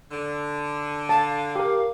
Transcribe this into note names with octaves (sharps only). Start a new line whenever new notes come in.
D3
F5 A5
G4 A#4